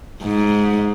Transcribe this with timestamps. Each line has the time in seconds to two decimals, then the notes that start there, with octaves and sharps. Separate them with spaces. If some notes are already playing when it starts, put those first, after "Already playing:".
0.23 G#2